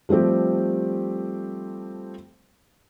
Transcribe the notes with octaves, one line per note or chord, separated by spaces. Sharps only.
F3 G3 A3 C4 G4